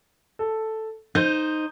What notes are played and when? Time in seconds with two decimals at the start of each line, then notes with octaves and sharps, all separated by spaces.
0.39 A4
1.15 D#4 C5 G6